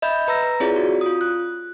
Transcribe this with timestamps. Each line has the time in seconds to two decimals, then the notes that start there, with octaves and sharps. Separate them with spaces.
0.02 D#5 E5 B5 G6
0.28 B4 A#5 E6 A#6
0.60 C4 E4 F4 G#4 C#5 D5
0.76 F#4
1.01 F4 D#6
1.21 F#6